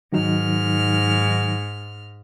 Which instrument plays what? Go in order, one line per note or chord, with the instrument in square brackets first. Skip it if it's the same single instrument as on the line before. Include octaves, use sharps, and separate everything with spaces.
[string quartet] G#2 F6 [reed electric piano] D#3 F#3 D#4